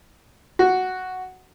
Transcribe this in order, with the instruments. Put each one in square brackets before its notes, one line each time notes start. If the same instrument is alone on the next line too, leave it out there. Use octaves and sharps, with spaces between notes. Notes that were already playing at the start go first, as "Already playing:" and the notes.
[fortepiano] F#4